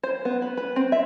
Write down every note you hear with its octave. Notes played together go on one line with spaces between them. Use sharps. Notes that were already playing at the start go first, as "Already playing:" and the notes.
C5
B3
B4
B4
C4
E5